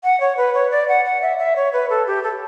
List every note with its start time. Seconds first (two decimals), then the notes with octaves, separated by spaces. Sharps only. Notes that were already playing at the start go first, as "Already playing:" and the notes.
0.04 F#5
0.20 C#5
0.37 B4
0.54 C#5
0.71 D5
0.88 F#5
1.05 F#5
1.22 E5
1.39 E5
1.56 C#5
1.73 B4
1.90 A4
2.07 G4
2.23 A4